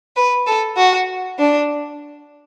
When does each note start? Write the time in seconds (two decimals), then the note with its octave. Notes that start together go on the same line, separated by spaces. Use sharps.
0.16 B4
0.46 A4
0.77 F#4
1.38 D4